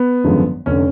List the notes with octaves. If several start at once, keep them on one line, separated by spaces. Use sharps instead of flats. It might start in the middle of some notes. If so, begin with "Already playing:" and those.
Already playing: B3
G#1 F#2 D3 F3 G#3
F1 D3 C#4